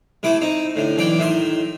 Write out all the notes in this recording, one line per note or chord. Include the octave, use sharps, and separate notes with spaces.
C3 A3 E4 D6
C4 D#4
A2 D3
B1 E3 D5 G5
A2 D#3 E5 C6